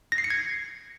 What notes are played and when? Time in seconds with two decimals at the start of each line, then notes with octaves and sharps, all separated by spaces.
0.12 A#6
0.18 C7
0.24 C#7
0.30 G#6